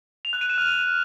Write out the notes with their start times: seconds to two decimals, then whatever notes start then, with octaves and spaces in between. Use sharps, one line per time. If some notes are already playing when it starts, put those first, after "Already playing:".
0.25 F7
0.33 F#6
0.41 D#7
0.49 E7
0.58 F6